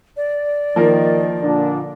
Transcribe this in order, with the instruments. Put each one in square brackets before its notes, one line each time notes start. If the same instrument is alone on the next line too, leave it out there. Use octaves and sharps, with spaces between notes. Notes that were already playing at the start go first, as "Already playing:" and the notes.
[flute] D5
[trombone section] D#3 [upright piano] F3 A#3 A#4
[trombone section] A#2 D3 D4